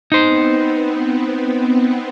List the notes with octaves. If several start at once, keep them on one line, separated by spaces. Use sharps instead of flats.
B3 C4 D#4 C5